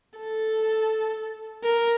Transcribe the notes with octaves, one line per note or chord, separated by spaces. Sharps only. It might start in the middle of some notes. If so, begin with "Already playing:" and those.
A4
A#4